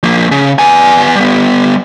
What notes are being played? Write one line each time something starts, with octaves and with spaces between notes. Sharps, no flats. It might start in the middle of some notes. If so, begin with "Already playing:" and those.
F3 A#3
C#3
B3 G#5
G3 B3